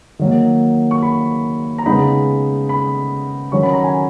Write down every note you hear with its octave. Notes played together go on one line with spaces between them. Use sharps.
D#3 F#3 A#3
C#6
B5
A#5
C#3 G#3 B3 D#4 B5
B5
D#3 F#3 C#4 C#6
B5
A#5
G#5